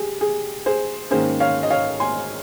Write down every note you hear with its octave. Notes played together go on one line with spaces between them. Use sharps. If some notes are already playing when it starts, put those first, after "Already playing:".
Already playing: G4 G#4
G#4
G#4 C5
G#2 D#3 A#3 C#4 G#4 C5
C#5 F5
D#5
C#5 F5
G#5 C6